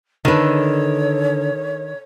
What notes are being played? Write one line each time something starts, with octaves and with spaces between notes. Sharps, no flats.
D3 D#3 D4 B4 C#5